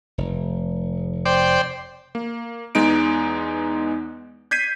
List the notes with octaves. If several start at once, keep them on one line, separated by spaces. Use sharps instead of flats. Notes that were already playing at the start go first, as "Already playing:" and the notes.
F1
C5 D5 G5
A#3
E2 G#3 B3 D#4 D7
G6 G#6 B6 C7 D#7